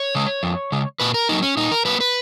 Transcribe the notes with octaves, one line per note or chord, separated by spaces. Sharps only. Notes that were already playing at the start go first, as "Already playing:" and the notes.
Already playing: C#5
C#3 G#3
F2
C#3 G#3
A#2 B4
A#4
F#3 A#3 D#4
C#4
A#2 D#4
A#4
F#3 A#3 B4
B4